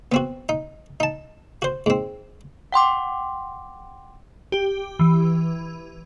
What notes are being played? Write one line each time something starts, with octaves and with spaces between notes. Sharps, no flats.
B3 C4 F#4
D#4
D#4 A5
F#4 C5
G#2 C4
F#5 G5 C6 D6
G4
E3